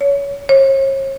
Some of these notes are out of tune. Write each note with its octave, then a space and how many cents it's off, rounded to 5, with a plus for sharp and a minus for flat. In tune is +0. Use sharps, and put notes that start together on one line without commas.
C#5 +25
C#5 -40